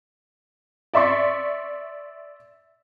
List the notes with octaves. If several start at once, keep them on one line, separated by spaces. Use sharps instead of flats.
D5 E5 C6 C#6